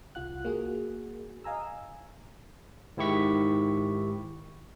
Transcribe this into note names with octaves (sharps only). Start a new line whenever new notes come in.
C2 F4 F#5 F#6
A#3 F#4 G#4
D#5 F5 G#5 A#5 E6
G#2 D#3 E4 G4 C#6 B6